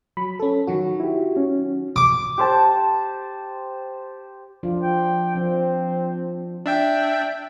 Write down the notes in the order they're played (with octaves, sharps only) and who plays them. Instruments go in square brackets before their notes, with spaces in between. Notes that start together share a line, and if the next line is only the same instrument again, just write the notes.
[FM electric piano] F#3 B5
C#4 A4
D#3 F#3 F#4
[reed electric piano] E4 G4
C#4
[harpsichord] D6
[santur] G4 C5 A5
[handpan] F3 D4 F4
[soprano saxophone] G5
[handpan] F3 [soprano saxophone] C4
[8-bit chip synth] D4 E5 G5